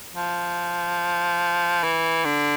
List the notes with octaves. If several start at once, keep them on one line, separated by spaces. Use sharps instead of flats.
F3
E3
D3